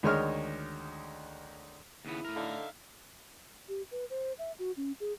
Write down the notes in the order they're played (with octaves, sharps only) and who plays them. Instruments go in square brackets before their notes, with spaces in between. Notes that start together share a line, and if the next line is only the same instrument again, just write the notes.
[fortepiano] D2 D#3 G#3 C#5 D#5 F6
[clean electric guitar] D#2 C#3 B3 [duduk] E4
[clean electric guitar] A2 A#4
[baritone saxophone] D3 [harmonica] D#4 E5 F5
[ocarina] G4
B4
C5
E5
F#4
C#4
G#4